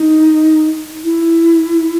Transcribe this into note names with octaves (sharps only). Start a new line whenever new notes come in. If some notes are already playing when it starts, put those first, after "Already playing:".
Already playing: D#4
E4